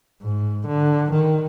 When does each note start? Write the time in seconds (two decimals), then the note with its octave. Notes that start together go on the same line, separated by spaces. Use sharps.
0.22 G#2
0.67 D3
1.12 D#3